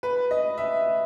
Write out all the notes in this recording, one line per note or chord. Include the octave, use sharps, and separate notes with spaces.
B4
D#5
E5